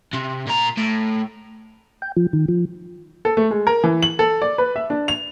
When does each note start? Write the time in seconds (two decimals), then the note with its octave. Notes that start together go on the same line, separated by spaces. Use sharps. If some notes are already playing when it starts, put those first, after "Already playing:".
0.13 C3
0.47 A#2 A#5
0.77 A2
2.02 G5
2.17 F3
2.33 D#3
2.48 F3
3.25 A4
3.37 A3
3.51 G#3
3.67 A#4
3.84 E3
4.03 F#7
4.19 A4
4.42 D5
4.58 B4
4.76 E5
4.90 D4
5.08 F7